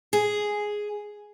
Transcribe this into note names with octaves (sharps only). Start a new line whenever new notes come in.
G#4